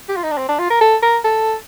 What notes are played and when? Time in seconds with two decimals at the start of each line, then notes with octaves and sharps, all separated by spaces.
0.09 G4
0.16 F4
0.23 D#4
0.31 D4
0.37 C4
0.48 D4
0.59 F4
0.70 A#4
0.81 A4
1.02 A#4
1.24 A4